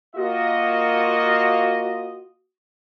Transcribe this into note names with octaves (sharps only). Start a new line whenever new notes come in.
A#3 F4 F#4 D#5